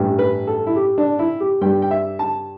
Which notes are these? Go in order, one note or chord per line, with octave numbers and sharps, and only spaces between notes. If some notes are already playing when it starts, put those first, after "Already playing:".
Already playing: A1 G2 G3
B4
A4
E4
G4
D4
E4
G4
G2 G3 G5
G5
E5
A5